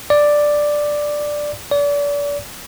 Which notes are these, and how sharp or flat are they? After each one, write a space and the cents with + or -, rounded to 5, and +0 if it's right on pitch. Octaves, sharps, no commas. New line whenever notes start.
D5 +5
D5 -35